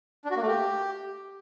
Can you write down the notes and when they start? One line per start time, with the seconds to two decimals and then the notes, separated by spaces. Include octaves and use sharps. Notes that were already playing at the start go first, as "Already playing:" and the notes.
0.25 D4
0.31 F#4
0.36 A#3
0.42 A3
0.48 G4